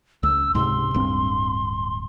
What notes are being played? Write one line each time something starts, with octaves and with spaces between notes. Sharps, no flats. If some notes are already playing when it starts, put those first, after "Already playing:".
C#2 E6
C#2 G#2 C3 C6
D1 G2 C4